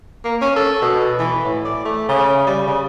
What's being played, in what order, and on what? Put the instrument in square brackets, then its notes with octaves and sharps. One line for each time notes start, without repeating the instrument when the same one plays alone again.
[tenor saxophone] A#3
C#4
A4
B2
E3
A2
D5
A3
C#3
G3
C#3